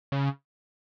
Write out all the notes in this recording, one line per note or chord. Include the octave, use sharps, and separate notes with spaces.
C#3